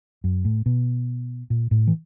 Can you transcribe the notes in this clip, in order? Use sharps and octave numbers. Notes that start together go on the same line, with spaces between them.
F#2
A2
B2
A#2
A2
E3